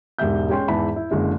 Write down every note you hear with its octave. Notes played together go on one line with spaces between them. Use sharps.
E1 G#2 G4 E5 G6
G#3 C#4 G5 C6
E2 G#2 E3 E5 A5 B5
E4
F#1 D3 G#3 E4